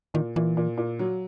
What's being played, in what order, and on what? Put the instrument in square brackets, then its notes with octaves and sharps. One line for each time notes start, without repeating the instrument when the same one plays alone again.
[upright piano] A#2 [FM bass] D#3
[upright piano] A#2 [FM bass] E3
[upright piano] A#2
A#2
F#3